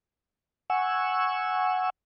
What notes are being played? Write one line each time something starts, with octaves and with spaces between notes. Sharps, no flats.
F#5 G#5 C#6 E6